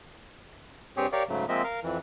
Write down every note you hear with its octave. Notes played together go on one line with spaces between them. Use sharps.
G2 C4 G4 G#4 C#5
G4 A#4 C#5 D5 F5
G#2 C#3 F#3 A3
F3 G#3 A#3 C4 D#5 E5
A#4 F5
F2 E3